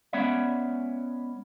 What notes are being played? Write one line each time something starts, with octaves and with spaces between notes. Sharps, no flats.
G#3 B3 C#4 D5 E5 F#5